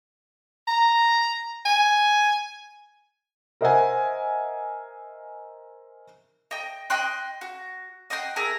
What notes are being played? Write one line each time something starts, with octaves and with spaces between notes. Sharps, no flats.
A#5
G#5
A#4 C5 D#5 E5 F#5 G#5
D#5 G5
D#5 G5 C6 F#6
F#4
D#5 F#5 G5 C6
G#4 A#4 E5 A#5